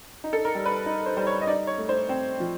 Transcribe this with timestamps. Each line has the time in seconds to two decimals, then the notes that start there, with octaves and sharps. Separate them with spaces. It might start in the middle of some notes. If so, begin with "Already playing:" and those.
0.24 D#4
0.33 A4
0.45 A#4
0.55 G3
0.66 B4
0.86 D#4
1.06 C5
1.17 G3 C5
1.27 C#5
1.41 D#5
1.47 D#4 D5
1.67 C#5
1.78 A3
1.89 C5
2.09 C4
2.40 F3